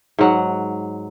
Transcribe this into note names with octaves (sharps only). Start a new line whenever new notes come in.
G#2 F#3 F#5